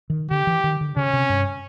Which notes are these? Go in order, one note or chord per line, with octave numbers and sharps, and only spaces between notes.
D#3
D3 G4
E3
D#3
D3
C#3 C#4
C3
G2